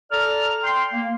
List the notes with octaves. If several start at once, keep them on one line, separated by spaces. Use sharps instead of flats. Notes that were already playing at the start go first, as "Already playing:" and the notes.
A4 D5 A#5 F6
G5 C6
A#3